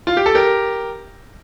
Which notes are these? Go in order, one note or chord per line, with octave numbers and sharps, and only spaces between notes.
F4
G4
A4
G4 A#4